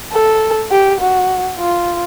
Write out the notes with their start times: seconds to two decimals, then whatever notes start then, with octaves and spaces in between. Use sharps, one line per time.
0.12 A4
0.71 G4
1.00 F#4
1.58 F4